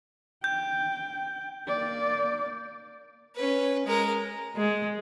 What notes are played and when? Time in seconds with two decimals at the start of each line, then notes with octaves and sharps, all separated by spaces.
0.44 G5 G6
1.67 A#3 D5
3.36 C#4 B4
3.86 G#3 A#4
4.56 G#3